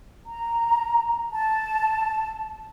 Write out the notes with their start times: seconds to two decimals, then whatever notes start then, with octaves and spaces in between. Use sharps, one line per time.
0.27 A#5
1.32 A5